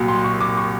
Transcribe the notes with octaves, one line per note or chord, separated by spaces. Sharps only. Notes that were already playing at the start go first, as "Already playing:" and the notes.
Already playing: C2 A#2 F#3
C6
C#6
D6
C#6